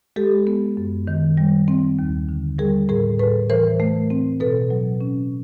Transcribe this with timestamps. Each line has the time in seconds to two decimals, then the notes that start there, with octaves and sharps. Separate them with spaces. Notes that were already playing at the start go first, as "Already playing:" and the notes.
0.16 G#3 G4 A4
0.47 B3
0.77 F#2
1.07 D#3
1.38 G3
1.68 C4
1.99 D#2
2.29 D3
2.59 G3 G#4 A#4
2.89 A2 G#4 A#4
3.19 A2 A4 B4
3.50 E3 A#4 C5
3.80 A3
4.10 C4
4.40 B2 A4 B4
4.70 F#3
5.01 C#4